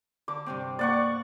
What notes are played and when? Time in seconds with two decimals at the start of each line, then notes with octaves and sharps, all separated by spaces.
0.28 D3 D6
0.46 G2 C3 C4
0.79 A#3 D5 F#5 C#6